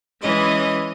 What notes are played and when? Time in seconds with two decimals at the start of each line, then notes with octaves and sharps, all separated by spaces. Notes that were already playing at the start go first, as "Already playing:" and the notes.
0.22 E3 G#3 C#4 D#5